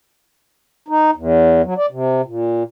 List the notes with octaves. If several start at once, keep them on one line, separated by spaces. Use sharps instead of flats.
D#4
E2
F#3
D5
C3
A#2